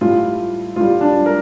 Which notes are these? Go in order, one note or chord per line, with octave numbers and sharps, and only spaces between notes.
A2 G3 F4
A2 G3 F4
D4
A#4